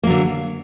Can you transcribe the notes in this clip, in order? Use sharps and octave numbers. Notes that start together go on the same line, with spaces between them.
D3 F#3 A#3